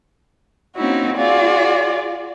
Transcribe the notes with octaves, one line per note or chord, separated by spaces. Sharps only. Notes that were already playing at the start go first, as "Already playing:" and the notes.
A#3 C4 C#4 D#4 E4 F#4
F4 F#4 G#4 D5